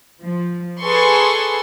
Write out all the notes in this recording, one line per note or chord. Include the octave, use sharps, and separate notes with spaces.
F3
G#4 A4 B4 C6 C#6